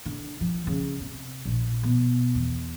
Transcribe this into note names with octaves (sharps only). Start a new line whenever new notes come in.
D3
F3
C#3
C3
A#1
B2
E2